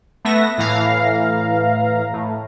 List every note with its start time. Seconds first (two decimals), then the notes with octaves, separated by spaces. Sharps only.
0.25 A3 B3 E5 A#6
0.58 A2 E3 F5 A#5
2.14 A2